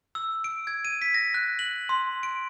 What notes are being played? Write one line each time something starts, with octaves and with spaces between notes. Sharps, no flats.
E6
D7
G#6
D#7
B6
A#6
F#6
F#7
C6
D7